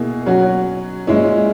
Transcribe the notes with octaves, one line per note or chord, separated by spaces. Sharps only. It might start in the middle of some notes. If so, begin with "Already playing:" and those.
Already playing: B2 A#3 E4 G#4
F#3 C#4 F#4
A#2 G#3 C#4 E4